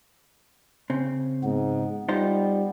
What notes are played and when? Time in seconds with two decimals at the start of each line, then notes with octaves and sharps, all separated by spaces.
0.90 C#3 C4
1.43 G#2 B3
2.09 G3 D#4 F4 C5